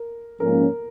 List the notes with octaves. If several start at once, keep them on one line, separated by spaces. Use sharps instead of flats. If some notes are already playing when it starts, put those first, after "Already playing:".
Already playing: A#4
G#2 F3 A#3 C#4 A#4